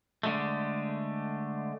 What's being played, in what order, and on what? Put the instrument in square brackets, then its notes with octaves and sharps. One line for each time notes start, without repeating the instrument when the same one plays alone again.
[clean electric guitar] D3 G#3 A3